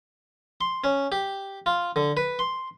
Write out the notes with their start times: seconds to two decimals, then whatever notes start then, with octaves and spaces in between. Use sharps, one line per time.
0.61 C6
0.84 C#4
1.12 G4
1.66 F4
1.96 D3
2.17 B4
2.39 C6